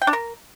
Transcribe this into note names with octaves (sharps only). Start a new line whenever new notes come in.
G5
D4
A#4